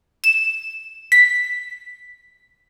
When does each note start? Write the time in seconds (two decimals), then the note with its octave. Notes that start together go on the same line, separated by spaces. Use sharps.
0.24 E7
1.12 B6